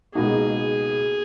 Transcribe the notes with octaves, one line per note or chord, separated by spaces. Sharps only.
C#2 B2 A#3 D#4 F#4 G#4